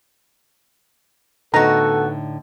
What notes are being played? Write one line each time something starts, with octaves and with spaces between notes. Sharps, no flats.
A2 D3 B3 D#4 F#4 A4 A#5